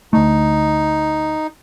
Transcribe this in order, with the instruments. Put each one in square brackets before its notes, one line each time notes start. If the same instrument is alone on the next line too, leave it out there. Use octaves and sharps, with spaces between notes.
[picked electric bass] D2 A3 [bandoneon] D#4